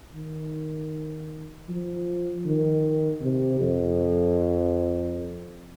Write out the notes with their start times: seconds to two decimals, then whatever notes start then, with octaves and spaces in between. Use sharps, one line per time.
0.15 D#3
1.69 F3
2.45 D#3
3.22 C3
3.61 F2